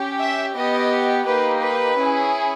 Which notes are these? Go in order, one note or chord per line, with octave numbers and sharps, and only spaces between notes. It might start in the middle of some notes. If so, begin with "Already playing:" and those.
Already playing: C#4 G4
E5
B3 G4 D#5
A#3 D#4 G4 B4
B4
C#4 E4 G#4